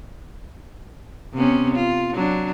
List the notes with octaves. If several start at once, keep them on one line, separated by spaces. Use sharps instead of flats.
C3 B3 C#4
F4
F#3 D4